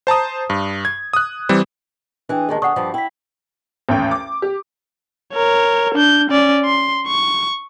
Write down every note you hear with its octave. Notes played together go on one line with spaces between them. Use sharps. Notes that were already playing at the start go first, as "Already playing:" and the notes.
C5 A5 A#5 D#6
G2
G#6
D#6 F#6
E3 G3 C4
E3 D4 G#4 G5
D#2 D#3 G#3 G#4 A5
D3 G#4 F#5 C#6 D#6
G2 F3 G4
E4 G5 B6
A1 D#2 C#4 G5
D6
G4
A#4 C#5
D4 G6
C#4 D5
C6
C#6